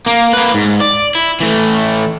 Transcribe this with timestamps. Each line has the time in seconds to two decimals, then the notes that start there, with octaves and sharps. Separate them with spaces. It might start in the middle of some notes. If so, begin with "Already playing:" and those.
0.06 A#3
0.33 A#3 B4
0.54 G#2
0.80 D5
1.15 E4
1.40 E3 A3